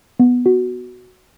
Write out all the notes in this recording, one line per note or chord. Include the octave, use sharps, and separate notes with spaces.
B3
F#4